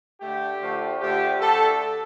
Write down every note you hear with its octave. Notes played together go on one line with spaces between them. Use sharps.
D3 A3 G4
D3 F3 A3
D3 F3 A3 G4
D3 A3 A4